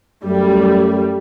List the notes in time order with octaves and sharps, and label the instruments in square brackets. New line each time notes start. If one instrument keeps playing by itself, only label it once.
[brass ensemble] F#2 A3 [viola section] G3